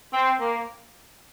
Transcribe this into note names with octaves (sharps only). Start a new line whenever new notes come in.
C4
A#3